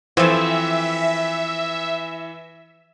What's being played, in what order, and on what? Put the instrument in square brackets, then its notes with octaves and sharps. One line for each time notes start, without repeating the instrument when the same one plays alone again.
[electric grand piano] E3 [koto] F3 A4 [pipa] C4 G#5 [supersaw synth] E5